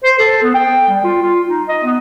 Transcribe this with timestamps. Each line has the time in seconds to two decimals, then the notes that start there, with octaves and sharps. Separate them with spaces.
0.04 C5
0.19 A4
0.42 B3
0.54 G5
0.88 G3
1.04 F4
1.22 F4
1.48 D#4
1.69 D#5
1.84 B3